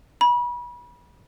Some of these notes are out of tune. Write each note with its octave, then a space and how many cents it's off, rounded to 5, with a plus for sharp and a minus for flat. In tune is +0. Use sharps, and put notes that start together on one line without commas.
B5 -30